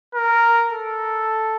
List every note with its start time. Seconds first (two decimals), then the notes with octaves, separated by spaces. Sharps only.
0.15 A#4
0.73 A4